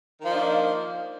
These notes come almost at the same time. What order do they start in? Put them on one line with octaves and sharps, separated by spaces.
D#3 F3 D#4 D4 A#3